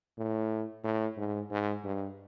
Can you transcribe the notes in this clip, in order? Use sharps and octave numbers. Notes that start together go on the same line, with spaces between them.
A2
A2
G#2
G#2
G2